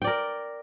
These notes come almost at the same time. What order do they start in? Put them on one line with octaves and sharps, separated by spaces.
G5 D5 A#4